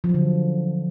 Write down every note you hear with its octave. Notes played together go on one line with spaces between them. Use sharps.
F3
F#3
D3